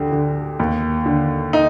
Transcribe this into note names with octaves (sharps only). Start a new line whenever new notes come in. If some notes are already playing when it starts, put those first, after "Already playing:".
Already playing: D2 D3 G4
D3
D#2
D3
D#4